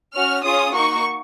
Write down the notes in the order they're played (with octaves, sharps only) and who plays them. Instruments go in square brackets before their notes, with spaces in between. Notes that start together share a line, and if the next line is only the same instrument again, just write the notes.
[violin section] C#4 F#4 F6
C#4 F4 G#4 D#6
A#3 D#4 F#4 C#6